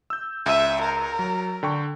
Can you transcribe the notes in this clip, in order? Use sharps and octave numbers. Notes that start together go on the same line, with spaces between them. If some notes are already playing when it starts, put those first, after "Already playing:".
E6 G6
C#2 E5 D#7
A#4
F#3
D3 G5 C#6